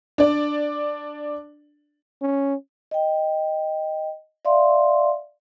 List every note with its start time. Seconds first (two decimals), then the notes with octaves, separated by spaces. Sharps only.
0.18 D4 D5
2.21 C#4
2.91 D#5 G5
4.45 D5 E5 F5 C6